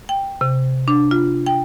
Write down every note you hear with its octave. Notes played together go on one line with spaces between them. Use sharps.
G5
C3
D4
F4
G5